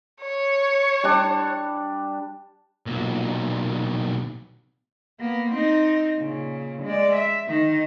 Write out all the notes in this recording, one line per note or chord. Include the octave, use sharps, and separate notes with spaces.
C#5
G3 D4
B1 A#2
A#3 B3
C4 D#4
A#2 C#3
G#3 D5
E5
D#3 D#4